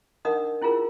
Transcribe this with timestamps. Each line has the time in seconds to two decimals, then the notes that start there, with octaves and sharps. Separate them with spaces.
0.25 D4 D#4 A#4 D#5 F#5 D#6
0.62 C#4 E4 F4 G#4 A#4